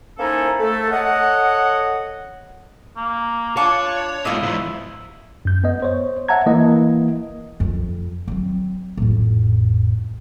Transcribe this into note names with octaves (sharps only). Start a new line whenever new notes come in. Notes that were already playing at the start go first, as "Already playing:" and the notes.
A#3 C#4 D#4 E4 A4 C5
A3 A4
A4 C#5 D#5 F#5
A#3
D4 F4 C#5 A5 D6
G#2 B2 E4 F4 D#5
E2 G#2
F#2 G6
B3 D#5
C5 C#5
E5 F#5 A5 A#5 G#6
E3 A#3 E4 D#5
F2
F#3 C4
A1 F2